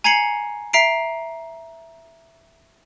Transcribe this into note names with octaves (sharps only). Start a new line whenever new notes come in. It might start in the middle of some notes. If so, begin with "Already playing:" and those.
G#5 A#5 G#6 C7 C#7 F#7
E5 A#5 C7 D7